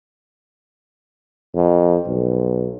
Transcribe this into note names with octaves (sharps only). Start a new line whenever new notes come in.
F2
B1